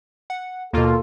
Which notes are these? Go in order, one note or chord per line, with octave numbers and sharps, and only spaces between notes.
F#5
D#2 B2 A#3 F4 A4